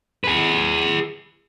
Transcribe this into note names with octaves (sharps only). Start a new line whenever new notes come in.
G#4 B4